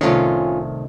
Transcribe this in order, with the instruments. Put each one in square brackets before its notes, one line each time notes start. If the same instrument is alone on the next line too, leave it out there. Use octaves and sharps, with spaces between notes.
[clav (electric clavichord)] C2 A2 D#3 [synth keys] C#4 F4